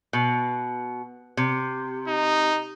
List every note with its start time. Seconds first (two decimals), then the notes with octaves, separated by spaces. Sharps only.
0.13 B2
1.37 C3
2.08 D#4